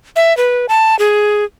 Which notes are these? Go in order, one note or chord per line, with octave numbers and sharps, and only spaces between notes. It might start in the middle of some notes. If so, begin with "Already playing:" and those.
E5
B4
A5
G#4